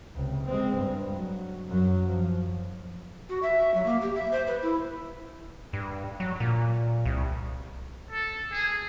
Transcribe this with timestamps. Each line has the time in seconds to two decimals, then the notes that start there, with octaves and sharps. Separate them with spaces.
0.14 C#2 C3
0.46 G#3 C4
0.76 G2
1.11 F#3
1.68 F#2 F#3
2.06 F3
3.29 F#4
3.43 E5
3.74 F#3
3.86 A#3
4.02 G4
4.15 E5
4.32 C5
4.47 B4
4.62 E4
5.73 G2
6.20 F#3
6.40 A#2
7.06 C2
8.11 A4
8.52 G#4